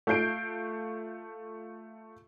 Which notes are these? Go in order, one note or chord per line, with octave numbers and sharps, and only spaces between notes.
A3 F4 G6 C7 D7